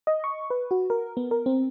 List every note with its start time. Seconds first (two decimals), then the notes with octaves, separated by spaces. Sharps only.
0.07 D#5
0.24 C#6
0.50 B4
0.71 F#4
0.90 A#4
1.17 B3
1.31 A#4
1.46 C4